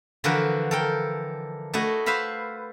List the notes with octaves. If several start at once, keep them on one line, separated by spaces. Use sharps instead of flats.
D3 E3 F3 F#4 A#4 B4
A4 A#4 G5
A3 E4 F#4 D#5
B4 C5 E5 F5 B5